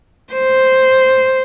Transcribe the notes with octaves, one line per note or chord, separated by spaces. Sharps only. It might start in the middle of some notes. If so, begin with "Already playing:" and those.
C5